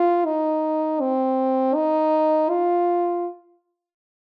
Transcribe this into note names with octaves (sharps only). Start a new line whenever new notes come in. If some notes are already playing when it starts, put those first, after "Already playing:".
Already playing: F4
D#4
C4
D#4
F4